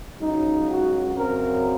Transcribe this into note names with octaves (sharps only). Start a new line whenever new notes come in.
C#2 C#3 F#3 D#4
F#4
F#2 C#3 F#3 C4 A#4